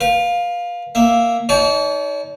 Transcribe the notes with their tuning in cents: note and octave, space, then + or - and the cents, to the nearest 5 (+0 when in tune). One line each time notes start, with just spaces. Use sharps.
B4 -25 F5 +10
A#3 +0 E5 +0
D#4 +20 C#5 +45 A5 -35